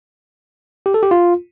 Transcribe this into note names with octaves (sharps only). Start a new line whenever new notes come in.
G4
A4
G4
F4